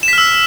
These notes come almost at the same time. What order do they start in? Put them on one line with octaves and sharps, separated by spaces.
E7 B6 F6 E6